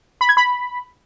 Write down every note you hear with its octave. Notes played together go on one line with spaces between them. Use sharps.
B5
G#6
B5